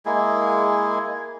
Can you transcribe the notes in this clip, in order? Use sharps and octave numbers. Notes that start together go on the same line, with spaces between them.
G#3 A#3 E4 G#4